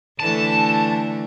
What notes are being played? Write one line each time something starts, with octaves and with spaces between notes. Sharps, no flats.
D3 E3 A3 A5